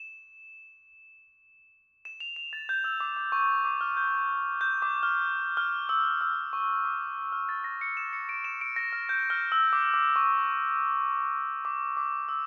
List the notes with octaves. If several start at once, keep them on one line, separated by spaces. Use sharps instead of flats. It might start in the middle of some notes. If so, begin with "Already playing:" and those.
Already playing: E7
E7
F7
F7
A6
G6
E6
D6
D6
C#6
D6
F6
G6
G6
D6
F6
F6
E6
E6
C#6
D6
F6
A6
A#6
C#7
E7
C#7
D7
E7
D7
A#6
F6
G6
F6
E6
D6
D6
C#6
D6
D6
E6